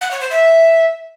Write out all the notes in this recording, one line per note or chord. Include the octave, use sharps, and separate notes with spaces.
F#5
C#5
C5
E5